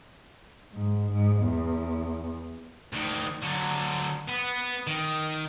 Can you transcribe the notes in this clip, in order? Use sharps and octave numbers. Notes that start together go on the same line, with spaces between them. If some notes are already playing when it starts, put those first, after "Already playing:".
G#2
G#2
E2
D2 D#3
D3 F#3
B3 B4
D#3